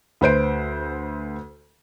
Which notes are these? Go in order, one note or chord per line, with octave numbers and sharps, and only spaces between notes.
D2 B4 C5 D7